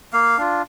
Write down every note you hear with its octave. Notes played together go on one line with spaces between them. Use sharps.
A#3 F5
D4 F4